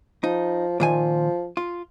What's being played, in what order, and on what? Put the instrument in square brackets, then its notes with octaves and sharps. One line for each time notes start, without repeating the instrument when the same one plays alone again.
[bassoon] F3 [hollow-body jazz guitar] D#4
[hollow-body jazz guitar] A#2 D#3 G#5 [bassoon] F3
[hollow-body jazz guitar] F4